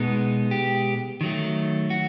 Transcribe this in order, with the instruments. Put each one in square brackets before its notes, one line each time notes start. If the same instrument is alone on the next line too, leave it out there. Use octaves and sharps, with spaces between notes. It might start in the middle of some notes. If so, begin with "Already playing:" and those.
Already playing: [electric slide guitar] B2 G#3 B3 D#4
G4
D#3 F#3 A3
F#4